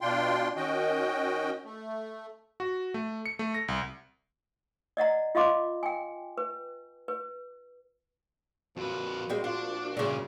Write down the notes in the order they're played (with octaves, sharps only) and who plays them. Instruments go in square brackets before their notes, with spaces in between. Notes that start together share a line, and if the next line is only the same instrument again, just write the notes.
[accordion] B2 D4 F4 G5 C6
D#3 C#4 F#4 D#5 G5
A3
[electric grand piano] F#4
A3
C#7
A3
A#6
C2
[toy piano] D5 D#5 F#5 A#5
F4 D#5 F5 C6 D6
G5 G#5
B4
B4
[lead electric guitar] F2 B4 [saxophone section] A#2 F3 F#4
[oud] G3 G#3 C4
[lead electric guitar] D4 [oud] F4
[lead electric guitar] G2 A#2 [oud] C#3 D4 [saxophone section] E4 F#4